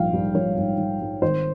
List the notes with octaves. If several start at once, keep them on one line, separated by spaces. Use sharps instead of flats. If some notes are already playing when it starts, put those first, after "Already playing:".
Already playing: A#1 G#2 G3 F5 G5
G#2 G3
A#1 C#5
G#2 G3
A#1
G#2 G3
G#1 C5